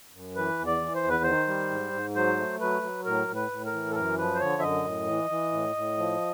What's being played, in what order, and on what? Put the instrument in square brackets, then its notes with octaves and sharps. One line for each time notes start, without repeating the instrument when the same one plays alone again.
[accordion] F#2
E3 B4
E2
D5
E3
C5
E2
B4
D#3 C5
G3
G#2
G#2
F#3 C5
A3
F#3 B4
F#3
A2 A#4
A2
B4
A2
A#4
E3
A4
F#2 A#4
F3 B4
C5
D3 C#5
E5
F#2 D#5
A2
E3
E3
A2
A2
F3